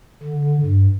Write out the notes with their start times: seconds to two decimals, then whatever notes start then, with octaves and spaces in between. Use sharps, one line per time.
0.23 D3
0.63 G2